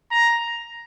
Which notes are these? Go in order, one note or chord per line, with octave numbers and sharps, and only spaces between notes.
A#5